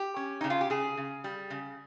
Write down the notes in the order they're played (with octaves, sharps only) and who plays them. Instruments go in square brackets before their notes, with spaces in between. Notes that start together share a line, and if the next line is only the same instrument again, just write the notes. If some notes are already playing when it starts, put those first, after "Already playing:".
Already playing: [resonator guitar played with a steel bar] G4
C#4
C#3 D#4
F4
G4
C#3 G#4
C#3
G3
C#3